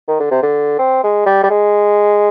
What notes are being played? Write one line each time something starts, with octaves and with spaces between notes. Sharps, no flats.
D#3
D3
C3
D3
C4
G#3
G3
G3
G#3